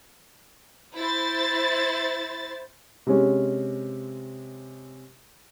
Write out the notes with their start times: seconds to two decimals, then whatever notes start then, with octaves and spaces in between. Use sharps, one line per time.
0.96 E4 C5 A6
3.07 C3 G#3 C#4